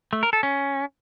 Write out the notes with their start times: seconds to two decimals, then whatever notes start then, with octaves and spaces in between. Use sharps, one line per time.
0.13 A3
0.23 A#4
0.33 A4
0.43 C#4